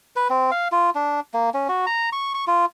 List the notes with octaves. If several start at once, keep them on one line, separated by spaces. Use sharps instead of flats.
B4
C4
F5
F4
D4
A#3
C#4
F#4
A#5
C#6
C#6
F4